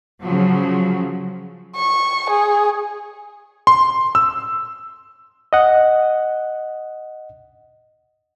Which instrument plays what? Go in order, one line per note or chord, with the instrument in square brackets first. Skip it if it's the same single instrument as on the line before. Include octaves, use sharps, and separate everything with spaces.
[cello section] C#3 F3 F#3
[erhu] C#6
G#4
[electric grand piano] C6
E6
[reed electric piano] D#5 F#5